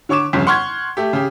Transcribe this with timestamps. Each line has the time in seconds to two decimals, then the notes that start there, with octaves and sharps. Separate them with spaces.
0.09 D3 C#5 C#6 D6 E7
0.33 G1 F2 C#3
0.47 F#5 C6 C#6 F6 G#6
0.97 A3 G4
1.13 C#3 G4